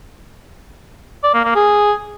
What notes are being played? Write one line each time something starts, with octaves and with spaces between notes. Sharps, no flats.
D5
A#3
A#3
G#4